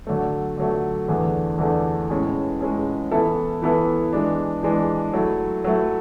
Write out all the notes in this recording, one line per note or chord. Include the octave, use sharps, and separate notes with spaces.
D3 F#3 A3
D3 F#3 A3
E2 D3 A3 D4 G#4
E2 D3 A3 D4 G#4
A2 G#3 C#4 G#4
A2 G#3 C#4 G#4
E3 B3 E4 A4
E3 B3 E4 A4
E3 G#3 D4
E3 G#3 D4
F#3 A3 E4
F#3 A3 E4